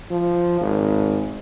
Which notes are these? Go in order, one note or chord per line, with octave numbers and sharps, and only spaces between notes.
F3
G#1